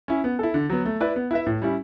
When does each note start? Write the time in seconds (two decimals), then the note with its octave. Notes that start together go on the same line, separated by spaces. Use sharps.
0.08 C#4 E4
0.24 B3
0.39 E4 A4
0.54 D3
0.70 F#3 B3
0.85 A3
1.00 E4 B4 D5
1.16 B3
1.31 E4 B4 E5
1.46 A2
1.62 G3 C#4 E4